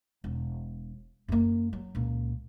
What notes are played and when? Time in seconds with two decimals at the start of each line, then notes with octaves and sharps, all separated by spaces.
0.24 E1
1.28 F#2 A#3
1.73 F#3
1.95 C#2 A#2